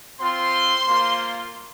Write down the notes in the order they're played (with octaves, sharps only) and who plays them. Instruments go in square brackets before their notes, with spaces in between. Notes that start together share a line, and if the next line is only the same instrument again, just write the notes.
[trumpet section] C4 F4 C5 C6
A#3 F4